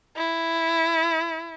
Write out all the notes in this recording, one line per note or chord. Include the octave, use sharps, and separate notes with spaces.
E4